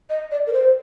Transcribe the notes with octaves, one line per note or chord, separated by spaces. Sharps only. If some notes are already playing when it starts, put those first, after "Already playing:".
D#5
D5
A#4
C5